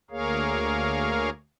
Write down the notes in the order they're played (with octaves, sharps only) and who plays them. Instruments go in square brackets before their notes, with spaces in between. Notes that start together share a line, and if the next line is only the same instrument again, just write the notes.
[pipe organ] D2 A#3 G#4 A#4 C#5 F5